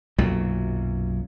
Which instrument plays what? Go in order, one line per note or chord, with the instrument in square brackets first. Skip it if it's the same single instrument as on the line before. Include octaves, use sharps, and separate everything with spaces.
[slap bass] B1 F#2 A#2 F#3